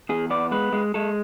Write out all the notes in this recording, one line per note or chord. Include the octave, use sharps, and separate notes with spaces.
E2 G#4
B3 D5
G#3 B4
G#3
G#3 A4